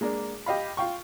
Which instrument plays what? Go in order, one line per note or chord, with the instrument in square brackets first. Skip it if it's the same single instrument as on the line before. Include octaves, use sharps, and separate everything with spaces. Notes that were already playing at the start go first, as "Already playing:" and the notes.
[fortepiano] G#3 A#3 D4
G4 D#5 F5 B5
F4 F5 G5 C#6